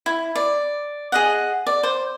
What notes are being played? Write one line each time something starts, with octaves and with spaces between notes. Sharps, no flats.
E4
D5
G#4 D#5 F#5
D5
C5